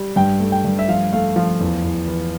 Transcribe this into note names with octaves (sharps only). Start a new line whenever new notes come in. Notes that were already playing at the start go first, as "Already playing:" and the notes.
Already playing: G3
G2 G5
A3
G5
G2
E5
F3 F5
A3 F5
F3 F5
E2
E2
E3